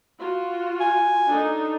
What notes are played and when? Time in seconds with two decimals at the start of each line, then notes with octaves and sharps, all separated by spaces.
0.20 F4 F#4
0.80 G#5
1.30 D4 D#4 A4